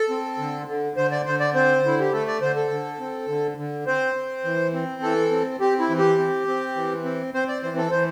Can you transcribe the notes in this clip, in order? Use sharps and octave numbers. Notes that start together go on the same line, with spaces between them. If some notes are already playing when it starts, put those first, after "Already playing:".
Already playing: A4
C4
D3
D3
D3 C5
D5
D3 C5
D5
C4 C5
D3 E4
G4
A3 A4
D5
D3 C5
A4
D3
C4
D3
D3
C4 C5
C4
E3
C4
E3 A4
C4
C4 G4
E4
E3
G4
C4
C4
E3
C4
C4 C5
D5
E3 C5
A4
E3 C5